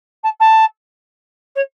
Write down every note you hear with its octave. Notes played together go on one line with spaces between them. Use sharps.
A5
A5
C#5